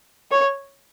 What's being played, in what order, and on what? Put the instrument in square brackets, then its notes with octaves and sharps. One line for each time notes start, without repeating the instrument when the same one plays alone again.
[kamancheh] C#5